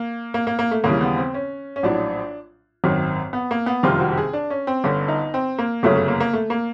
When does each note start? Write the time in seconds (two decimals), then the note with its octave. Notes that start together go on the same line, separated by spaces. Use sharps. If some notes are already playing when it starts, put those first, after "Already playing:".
Already playing: A#3
0.34 A#3
0.47 A#3
0.59 A#3
0.71 A3
0.84 D#2 C#3 E3 G3 A#3
1.01 B3
1.17 C4
1.34 C#4
1.76 C#4
1.83 A#1 A2 F#3 D4
2.84 G#1 F#2 D#3 F#3
3.33 B3
3.51 A#3
3.66 B3
3.83 F#1 F2 C3 D#3 G3 F4
4.00 F#4
4.12 G4
4.17 G#4
4.33 D4
4.50 C#4
4.67 C4
4.84 G1 G2 D3 C#4
5.08 D#4
5.34 C4
5.59 A#3
5.83 G1 F#2 C#3 F#3 A3
5.96 A3
6.08 A#3
6.20 A#3
6.33 A3
6.50 A#3